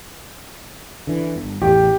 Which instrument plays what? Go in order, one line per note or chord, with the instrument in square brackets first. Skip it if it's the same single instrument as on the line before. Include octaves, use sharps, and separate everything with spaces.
[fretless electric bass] D3 E3
G1
[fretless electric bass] A1 E2 A2 [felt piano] G4